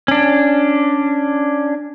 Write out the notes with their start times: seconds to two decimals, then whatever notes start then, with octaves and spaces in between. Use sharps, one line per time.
0.08 C#4 D4